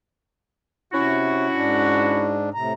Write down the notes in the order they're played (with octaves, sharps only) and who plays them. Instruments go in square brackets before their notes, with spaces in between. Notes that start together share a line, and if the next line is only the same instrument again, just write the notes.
[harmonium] C3 [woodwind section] C#4 E4 F#4
[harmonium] G#2 D4
A2 C3 A#5